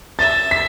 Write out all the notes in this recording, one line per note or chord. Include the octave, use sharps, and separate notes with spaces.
E5 A6
B6